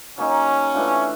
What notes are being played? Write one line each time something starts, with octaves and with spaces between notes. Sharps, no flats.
F#3 A#3 C#4 D#4
E3 A3 D4 F4